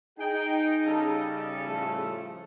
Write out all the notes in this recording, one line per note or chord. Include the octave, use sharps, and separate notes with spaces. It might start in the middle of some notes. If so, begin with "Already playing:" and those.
D#4 G#4 G5
C#3 G3 A4
A2 F3 A3